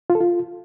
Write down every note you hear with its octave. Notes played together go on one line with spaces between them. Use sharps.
F4
A4
F4